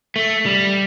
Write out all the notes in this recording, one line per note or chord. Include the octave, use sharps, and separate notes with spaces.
A3
G3